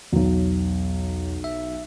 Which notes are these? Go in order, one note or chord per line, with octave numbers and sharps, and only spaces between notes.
B1 E2 F#3
E5